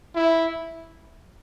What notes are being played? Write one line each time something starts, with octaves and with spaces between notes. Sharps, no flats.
E4